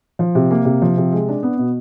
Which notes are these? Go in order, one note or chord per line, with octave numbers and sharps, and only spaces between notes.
F3
C3
A#3
C3
F3
C3
G#3
D4
B3
B2